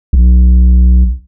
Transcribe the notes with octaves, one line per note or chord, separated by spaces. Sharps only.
B1